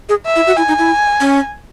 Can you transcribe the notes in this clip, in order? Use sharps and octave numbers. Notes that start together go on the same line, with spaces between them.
G#4
E5
E4
F#4
E4 G#5
D#4
E4
C#4